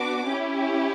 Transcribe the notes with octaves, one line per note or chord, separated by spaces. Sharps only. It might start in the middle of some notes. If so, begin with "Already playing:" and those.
Already playing: B3 D4 F#4 D6
C#4 E4 G4